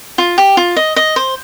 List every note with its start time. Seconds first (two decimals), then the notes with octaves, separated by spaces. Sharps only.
0.18 F4
0.38 G4
0.57 F4
0.76 D#5
0.96 D#5
1.16 C5